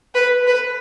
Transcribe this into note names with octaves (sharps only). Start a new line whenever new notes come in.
B4
B4